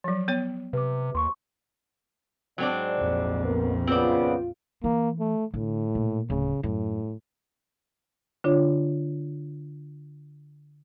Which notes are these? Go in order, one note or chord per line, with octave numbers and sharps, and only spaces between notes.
F3 F#3
B3 C#5 G5
C3 B4 D6
D#2 C6 C#6
G#2 F#3 C4 D4 D5
A#1 F2
B3 A#4
F#2 C#3 B3 C4 F4 D5
E3 A#3
A3
A2 D3
A#2
D1 C#3
F#2 A2
D3 D4 F4 C#5